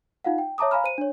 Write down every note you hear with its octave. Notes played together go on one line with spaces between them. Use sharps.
D#4 F4 F5 F#5
G5
C#5 E5 A5 A#5 D6 D#6
F5 G#5 A#5 B5 F6
C5 D#7
D4 C#5